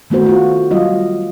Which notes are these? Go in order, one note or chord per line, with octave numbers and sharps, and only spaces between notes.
D#3 A3 B3 F#4 C5
F4 F#4
F#3 G3 F4 D#5